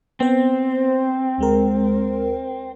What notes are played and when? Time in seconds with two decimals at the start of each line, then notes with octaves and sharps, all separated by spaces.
0.20 B3 C4 C5
1.38 D2 G#3 A#4